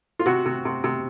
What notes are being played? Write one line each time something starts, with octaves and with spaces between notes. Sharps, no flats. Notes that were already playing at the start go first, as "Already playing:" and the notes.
F4
C3 F#4
C3
C3
C3